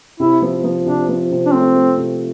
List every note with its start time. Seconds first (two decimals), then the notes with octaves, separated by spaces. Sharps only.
0.20 C3 E4
0.42 F3
0.64 F3
0.86 C3 D4
1.09 F3
1.31 C3
1.46 D4
1.53 A3 C4
1.75 A3
1.97 C3